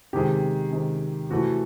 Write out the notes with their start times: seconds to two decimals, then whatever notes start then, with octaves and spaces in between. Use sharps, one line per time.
0.13 C3 D#3 G#3 G4
0.71 C3 D#3 G#3
1.30 C3 E3 A3 F#4